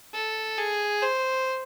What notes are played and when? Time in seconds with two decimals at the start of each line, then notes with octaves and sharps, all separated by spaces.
0.14 A4
0.58 G#4
1.02 C5